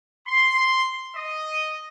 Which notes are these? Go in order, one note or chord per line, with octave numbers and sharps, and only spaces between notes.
C6
D#5